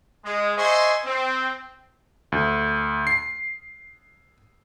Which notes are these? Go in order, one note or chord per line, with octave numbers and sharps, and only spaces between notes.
G#3
C5 D#5 E5 G#5 C6 C#6
C4
D2
C7